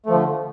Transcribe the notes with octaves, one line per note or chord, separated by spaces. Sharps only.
D3 F3 A3